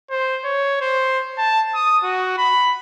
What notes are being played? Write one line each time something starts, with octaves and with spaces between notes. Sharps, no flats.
C5
C#5
C5
A5
D#6
F#4
B5